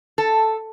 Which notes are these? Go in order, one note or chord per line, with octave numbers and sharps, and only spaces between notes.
A4